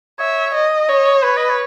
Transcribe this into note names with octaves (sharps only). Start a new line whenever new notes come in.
C#5 E5
D#5
C#5 D#5
B4 C#5
D#5
C#5